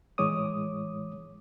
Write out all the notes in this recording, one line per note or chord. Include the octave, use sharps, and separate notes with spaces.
A2 E3 G#3 C#5 D6 D#6